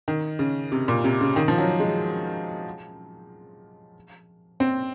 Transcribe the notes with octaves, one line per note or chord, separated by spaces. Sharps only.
D#3
C#3
C3
A#2
C3
C#3
D#3
F3
F#3
G#3
C4